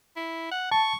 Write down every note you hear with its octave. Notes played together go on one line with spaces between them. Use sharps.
E4
F#5
A5 C#6